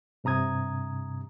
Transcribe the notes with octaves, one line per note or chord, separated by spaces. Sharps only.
G2 C3 A#5 D#6 G#6